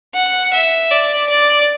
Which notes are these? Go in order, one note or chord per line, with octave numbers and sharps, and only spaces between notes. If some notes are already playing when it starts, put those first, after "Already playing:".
F#5
E5
D5
D5